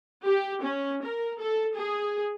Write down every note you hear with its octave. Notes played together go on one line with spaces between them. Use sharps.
G4
C#4
A#4
A4
G#4